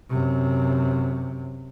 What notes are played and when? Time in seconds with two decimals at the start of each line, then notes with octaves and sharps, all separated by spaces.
0.10 F#2 C3